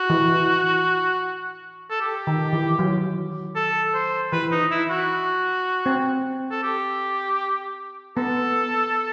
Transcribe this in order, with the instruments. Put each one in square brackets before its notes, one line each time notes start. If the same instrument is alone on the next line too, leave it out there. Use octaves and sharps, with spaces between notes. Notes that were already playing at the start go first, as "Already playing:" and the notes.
Already playing: [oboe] F#4
[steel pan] E3
[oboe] A4
G4
[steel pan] D#3
E3
F#3
[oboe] A4
C5
[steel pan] E3 [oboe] B4
[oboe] D#4
E4
F#4
[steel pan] C4
[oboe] A4
G4
[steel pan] B3 [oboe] A4